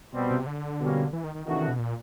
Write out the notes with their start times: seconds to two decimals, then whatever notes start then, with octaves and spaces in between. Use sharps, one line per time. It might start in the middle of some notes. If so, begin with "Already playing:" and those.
0.13 B2 G3 C4
0.31 C3
0.47 D3
0.80 B2 G3 A#3 C#4
1.13 E3
1.24 D#3
1.35 D#3
1.46 C3 D#3 E3 A3 D4 F#4
1.68 B2
1.79 A#2